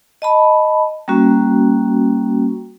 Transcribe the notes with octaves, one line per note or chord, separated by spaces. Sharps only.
D#5 A5 B5
G3 A#3 C#4 F#4